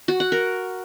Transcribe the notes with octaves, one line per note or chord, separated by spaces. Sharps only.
F#4
F#5
A#4